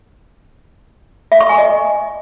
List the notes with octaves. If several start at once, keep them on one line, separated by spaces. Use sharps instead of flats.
E5
C#6
G#5
D#5